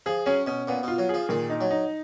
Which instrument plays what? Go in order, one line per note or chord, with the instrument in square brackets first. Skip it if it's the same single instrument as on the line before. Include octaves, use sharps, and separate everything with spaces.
[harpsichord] F3 [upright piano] G#4
[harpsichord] F#3 [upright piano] C#4
[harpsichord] B2 [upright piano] C#4
[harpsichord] A#2 [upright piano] B3
[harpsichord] B2 [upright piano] F4
[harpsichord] F#3
[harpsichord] F3 [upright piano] G#4
[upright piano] A#2 [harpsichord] D#3
[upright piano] D#4
[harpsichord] F#3
[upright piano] D#4